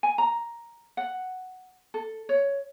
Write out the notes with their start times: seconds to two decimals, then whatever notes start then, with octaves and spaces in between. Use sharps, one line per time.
0.03 G#5
0.18 A#5
0.97 F#5
1.94 A4
2.29 C#5